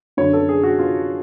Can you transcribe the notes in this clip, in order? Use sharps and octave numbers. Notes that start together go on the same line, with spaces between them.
F#2 D3 F#3 C#5
A4
G#4
F#4
F4